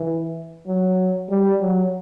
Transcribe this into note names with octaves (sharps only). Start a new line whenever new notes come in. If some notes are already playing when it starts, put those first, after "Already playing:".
Already playing: E3
F#3
G3
F#3